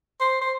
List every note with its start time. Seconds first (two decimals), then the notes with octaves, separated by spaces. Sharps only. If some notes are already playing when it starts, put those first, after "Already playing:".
0.20 C5
0.41 C5